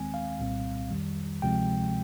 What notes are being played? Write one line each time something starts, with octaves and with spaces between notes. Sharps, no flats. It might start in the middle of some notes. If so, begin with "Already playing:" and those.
Already playing: D#2 D#3 G#3 C4 G#5
F5
C2 A#2 G3 C4
F2 D#3 G3
D2 C3 F3 G#3 C4 G5